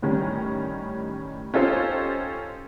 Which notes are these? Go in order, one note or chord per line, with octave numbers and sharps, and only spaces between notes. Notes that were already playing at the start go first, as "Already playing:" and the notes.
A2 D#3 G3 C#4
C#4 D#4 F4 G4 A4 C5